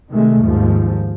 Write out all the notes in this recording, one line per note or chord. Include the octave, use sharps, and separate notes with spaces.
C3 D#3 G#3 A3
D#2 G#2 F3